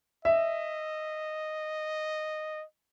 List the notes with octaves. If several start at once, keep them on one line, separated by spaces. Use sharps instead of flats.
D#5 E5